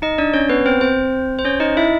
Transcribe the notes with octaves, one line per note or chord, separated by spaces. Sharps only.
D#4 D#5
D4 D5
C#4 C#5
B3 B4
C4 C5
C4 C5
C5
C#4 C#5
D#4 D#5
E4 E5